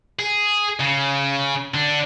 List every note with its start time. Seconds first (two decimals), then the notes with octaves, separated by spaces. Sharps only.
0.19 G#4
0.80 C#3
1.74 D3 D4